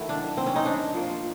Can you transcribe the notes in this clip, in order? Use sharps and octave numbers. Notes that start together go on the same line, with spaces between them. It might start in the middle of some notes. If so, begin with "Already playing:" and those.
Already playing: D#3 F#3 A3 E4
D4
C4
C#4
D#4
D4
A#2 F3 A#3